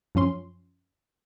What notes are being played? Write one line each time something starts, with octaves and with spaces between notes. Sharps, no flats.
F#2 F3 C#4 C6